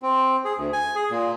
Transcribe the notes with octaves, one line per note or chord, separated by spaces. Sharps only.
C4
G#4
D2
G#5
G#4
A#2